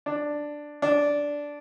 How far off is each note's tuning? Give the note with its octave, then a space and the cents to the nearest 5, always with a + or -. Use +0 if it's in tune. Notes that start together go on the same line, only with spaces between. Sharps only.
D4 +5
D4 -10